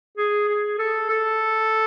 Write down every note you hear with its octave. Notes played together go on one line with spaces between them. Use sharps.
G#4
G#4
A4
A4